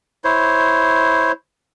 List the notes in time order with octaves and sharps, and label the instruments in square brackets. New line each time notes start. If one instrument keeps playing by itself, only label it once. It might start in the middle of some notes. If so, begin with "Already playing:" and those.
[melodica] E4 C5 C#5